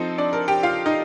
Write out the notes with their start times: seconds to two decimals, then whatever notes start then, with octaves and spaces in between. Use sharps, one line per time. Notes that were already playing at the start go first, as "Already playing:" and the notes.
Already playing: F3 C4 D#4 A4
0.18 D4 D5
0.33 A#4
0.48 G4 G5
0.63 F4 F5
0.86 D#4 D#5